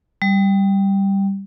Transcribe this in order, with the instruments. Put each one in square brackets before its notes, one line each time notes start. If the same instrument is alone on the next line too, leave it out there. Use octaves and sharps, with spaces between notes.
[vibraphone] G3